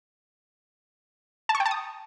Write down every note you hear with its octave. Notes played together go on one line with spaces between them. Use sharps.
A5
C#6
G5
A5
D#6